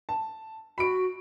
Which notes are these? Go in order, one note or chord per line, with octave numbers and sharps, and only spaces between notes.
A5
F#4 B5 D7